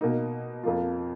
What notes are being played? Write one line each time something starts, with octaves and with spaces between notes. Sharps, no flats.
B2 A#3 D#4
F2 F3 A#3 F4